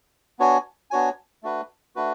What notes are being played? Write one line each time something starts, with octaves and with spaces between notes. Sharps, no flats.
B3 D4 F#4 C#5 G#5
B3 D4 F#4 C#5 G#5
A3 D4 F#4 B4
A3 D4 F#4 B4